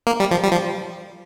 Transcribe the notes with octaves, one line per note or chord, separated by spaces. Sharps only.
A#3
G3
F3
G3
F3